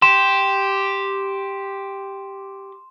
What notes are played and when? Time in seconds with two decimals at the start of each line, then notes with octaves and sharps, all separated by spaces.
0.02 G4 C6 E7